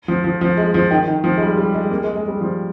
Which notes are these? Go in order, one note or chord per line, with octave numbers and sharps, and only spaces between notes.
F3
F3
F3
G#3
F3
D#3
D#3
F3
G#3
G3
G3
G#3
A#3
G#3
G#3
G3
F3